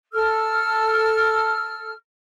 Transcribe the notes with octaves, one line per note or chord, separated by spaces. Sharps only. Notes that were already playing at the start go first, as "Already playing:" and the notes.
A4 E6 F6